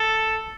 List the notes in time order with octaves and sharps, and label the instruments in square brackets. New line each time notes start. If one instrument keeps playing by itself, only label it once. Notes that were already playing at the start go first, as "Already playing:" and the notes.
Already playing: [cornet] A4